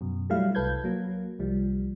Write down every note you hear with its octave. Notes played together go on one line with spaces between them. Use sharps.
F#2 B2
F#3 G3 A3 E4 F5
C2 A4 B4 G6 G#6
F#3 A#3
C2 F3 G3